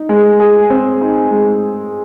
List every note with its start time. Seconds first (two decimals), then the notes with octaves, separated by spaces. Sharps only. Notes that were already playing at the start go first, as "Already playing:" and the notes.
Already playing: D#4
0.09 G#3
0.40 G#4
0.70 C4
1.01 D#4
1.31 G#3